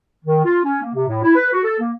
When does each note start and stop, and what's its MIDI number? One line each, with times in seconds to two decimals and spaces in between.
0.25 0.41 51
0.45 0.59 65
0.64 0.79 61
0.82 0.91 58
0.94 1.07 48
1.07 1.21 45
1.23 1.32 64
1.35 1.52 71
1.52 1.60 66
1.64 1.79 69
1.80 1.91 58